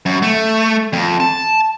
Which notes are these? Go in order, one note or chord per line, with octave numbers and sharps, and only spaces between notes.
F#2
A3
F2
A5